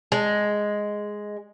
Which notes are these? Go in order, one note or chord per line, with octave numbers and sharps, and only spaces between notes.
G#3